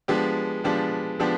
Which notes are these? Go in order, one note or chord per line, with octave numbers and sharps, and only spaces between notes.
F3 G#3 B3 D4 G4
F3 G#3 B3 D4 G4
F3 G#3 B3 D4 G4